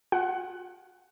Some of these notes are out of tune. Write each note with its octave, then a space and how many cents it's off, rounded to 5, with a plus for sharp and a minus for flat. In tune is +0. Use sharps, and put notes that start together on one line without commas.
F4 +40 F#5 +15